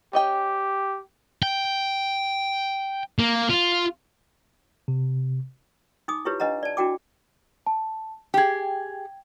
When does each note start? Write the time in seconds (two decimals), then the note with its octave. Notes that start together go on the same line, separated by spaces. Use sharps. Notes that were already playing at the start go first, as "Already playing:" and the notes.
0.13 C#4 G4 D#5 G5
1.43 G5
3.19 A#3
3.50 F4
4.88 C3
6.08 D#4 G#5 D6 D#6
6.25 E4 F4 G4 B4 C#5
6.40 D4 B4 D#5 F#5 A#5
6.63 D5 A5
6.77 D4 E4 F#4 G5 D6
7.67 A5
8.34 G4 G#4 G5 G#6